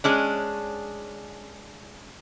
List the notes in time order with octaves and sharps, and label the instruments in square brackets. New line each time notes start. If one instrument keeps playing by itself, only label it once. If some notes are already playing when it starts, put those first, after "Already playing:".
[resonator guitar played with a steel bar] G#3 C#4 D4